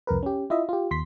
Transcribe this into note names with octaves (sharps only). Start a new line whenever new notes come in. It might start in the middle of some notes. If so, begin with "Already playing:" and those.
C2 F2 A#4 B4
C#4 G4
E4 F4 D#5 E5
F4 G4
D#2 C6 B6